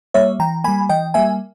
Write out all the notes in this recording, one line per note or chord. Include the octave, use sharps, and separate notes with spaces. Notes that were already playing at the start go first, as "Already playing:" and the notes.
G3 A#3 C#5 E5
E3 G5 A#5
G3 A#3 G#5 B5
E3 D#5 G5
G3 A#3 E5 G#5